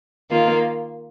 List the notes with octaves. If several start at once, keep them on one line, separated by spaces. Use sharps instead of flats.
D#3 A#3 F4